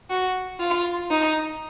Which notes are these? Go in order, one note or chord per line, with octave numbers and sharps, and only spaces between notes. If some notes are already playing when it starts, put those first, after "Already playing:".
F#4
F4
D#4